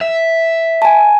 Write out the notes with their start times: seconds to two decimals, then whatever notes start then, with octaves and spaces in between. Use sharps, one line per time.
0.01 E5
0.82 G#5 A5